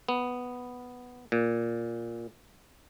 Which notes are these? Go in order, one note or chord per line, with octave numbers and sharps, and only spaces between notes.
B3
A#2